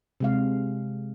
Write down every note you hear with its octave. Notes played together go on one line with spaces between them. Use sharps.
C3 G#3 F5